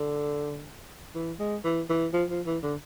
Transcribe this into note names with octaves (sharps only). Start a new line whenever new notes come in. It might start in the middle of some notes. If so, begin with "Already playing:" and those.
Already playing: D3
E3
G#3
E3
E3
F3
F3
E3
D3